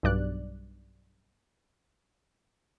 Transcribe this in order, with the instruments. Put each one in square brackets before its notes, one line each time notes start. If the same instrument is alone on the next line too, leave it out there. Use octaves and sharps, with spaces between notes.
[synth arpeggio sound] B1 G2 D5 F#6